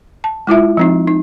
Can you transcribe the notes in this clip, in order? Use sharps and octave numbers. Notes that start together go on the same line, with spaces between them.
A5
G#3 E4 F4 E5
F3 C4 D#4
D#4